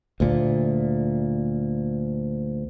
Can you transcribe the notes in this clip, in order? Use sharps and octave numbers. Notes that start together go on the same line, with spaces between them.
D2 A#2